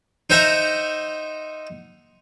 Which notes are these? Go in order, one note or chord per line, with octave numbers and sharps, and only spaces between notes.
D#4 C5 E5 F#5 A#5